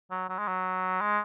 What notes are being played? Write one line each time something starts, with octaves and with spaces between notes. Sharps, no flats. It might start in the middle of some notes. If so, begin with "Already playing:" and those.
F#3
F#3
G#3
F#3
G#3